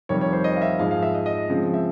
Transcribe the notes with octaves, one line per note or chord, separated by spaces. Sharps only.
F2 C3 D#3 G3 C#5
C#5
C5
D#5
F5
E5
G#2 F3 G#3 F5
F5
E5
D#5
D#5
C#3 F3 G#3 C4
E5